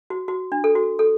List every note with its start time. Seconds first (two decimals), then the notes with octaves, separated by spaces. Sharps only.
0.10 F#4
0.28 F#4
0.52 D4
0.64 A4
0.75 F#4
0.99 A4